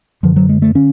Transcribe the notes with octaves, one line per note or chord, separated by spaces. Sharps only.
F#2 D3 F3
F#3
G#3
A3
D3 C#4